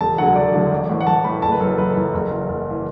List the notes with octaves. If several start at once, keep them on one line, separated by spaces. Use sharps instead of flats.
E1 A5
D2 D3 F#3 F#5
E1 D5
D2 D3 F#3
A1
A2 E3
F#5
A1 A5
A2 E3 B5
F#1 A5
B4
F#2 E3 A4
F#1 B4
A4
F#2 E3
F#1
F#2 E3
F#1
E3